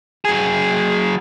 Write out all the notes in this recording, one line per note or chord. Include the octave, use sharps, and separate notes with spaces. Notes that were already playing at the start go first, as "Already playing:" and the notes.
F#3 G#4